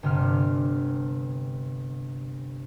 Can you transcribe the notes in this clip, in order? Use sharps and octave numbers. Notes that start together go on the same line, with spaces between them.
G1 C3 F6